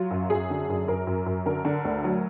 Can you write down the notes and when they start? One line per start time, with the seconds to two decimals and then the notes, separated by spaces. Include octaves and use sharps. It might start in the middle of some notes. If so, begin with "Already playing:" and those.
Already playing: F#3 F4
0.11 F#2
0.30 F#2 G#4
0.50 D3
0.69 F#2
0.88 F#2 A#4
1.07 F#2
1.26 F#2
1.46 D3 A#4
1.65 D3
1.85 D2
2.04 F#3